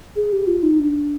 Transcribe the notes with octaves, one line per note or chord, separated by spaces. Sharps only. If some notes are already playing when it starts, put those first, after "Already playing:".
G#4
G4
F4
D#4
D4